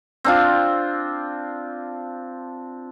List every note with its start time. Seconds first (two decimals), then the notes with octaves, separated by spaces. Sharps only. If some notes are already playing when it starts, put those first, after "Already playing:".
0.24 C4 D4 F4